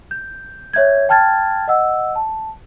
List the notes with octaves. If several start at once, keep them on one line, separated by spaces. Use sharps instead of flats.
G6
C#5 E5 G6 G#6
G5 A5 F6 G#6 A6
D#5 F#5 E6
A5